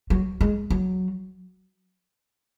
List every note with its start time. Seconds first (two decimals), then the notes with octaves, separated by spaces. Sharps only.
0.10 F#3
0.41 G#3
0.70 F#3